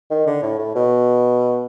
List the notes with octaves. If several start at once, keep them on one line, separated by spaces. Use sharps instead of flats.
D#3
D3
A2
A2
B2